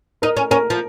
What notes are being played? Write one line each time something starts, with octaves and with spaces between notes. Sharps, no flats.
D#4 A#4
C#4
C#4 A#4
F3